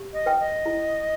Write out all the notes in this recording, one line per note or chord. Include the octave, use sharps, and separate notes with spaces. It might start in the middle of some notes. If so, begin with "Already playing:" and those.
Already playing: G4
D#5
B4 G5
D#5
E4